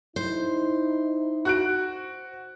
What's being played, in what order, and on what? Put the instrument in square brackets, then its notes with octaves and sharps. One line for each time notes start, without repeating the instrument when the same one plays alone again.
[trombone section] D#4 E4 [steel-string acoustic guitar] C5
[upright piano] F#4 F#6 D7